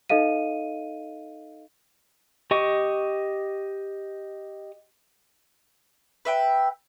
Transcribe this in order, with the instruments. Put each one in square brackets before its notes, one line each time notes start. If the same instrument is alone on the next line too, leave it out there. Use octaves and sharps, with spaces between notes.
[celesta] D#4 A4 D#5 F5 D#7
[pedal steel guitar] G4 D#5 C#6
[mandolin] B4 E5 G5